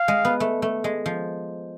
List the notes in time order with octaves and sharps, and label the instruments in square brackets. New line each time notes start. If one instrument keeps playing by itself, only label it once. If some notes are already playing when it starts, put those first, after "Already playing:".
Already playing: [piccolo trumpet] F5
[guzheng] G#3
B3
A3
A3
G#3
F3